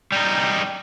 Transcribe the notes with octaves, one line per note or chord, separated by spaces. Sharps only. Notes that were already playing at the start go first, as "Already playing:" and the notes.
G3 D#4